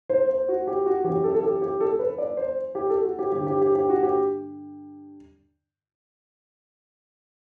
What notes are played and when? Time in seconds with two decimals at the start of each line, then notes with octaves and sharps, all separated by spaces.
0.09 C5
0.29 C5
0.48 F#4
0.67 G4
0.86 F#4
1.04 F#2 E3 G4
1.24 A4
1.34 A4
1.43 G4
1.62 G4
1.81 A4
1.99 B4
2.18 D5
2.37 C5
2.75 G4
2.90 A4
3.04 F#4
3.19 G4
3.32 G2 D3 G4
3.47 G4
3.61 G4
3.75 G4
3.89 F#4
4.03 G4